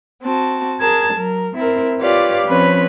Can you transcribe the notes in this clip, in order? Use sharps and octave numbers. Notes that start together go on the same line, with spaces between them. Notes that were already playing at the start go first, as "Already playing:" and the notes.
C4 F#4 A5
G#4 A#4 A5 G#6
F#3 A#4
C4 E4 A#4
F4 G4 B4 C#5 D5 F5
F3 C4 C#4 B4 C#5 B5